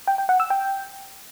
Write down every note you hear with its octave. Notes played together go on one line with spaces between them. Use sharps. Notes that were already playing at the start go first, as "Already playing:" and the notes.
G5
G5
F#5
E6
G5